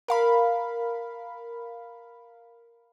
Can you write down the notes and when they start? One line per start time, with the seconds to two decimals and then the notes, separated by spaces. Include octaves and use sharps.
0.08 A#4 F5 B5